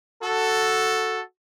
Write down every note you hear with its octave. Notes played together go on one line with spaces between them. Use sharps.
F#4 A4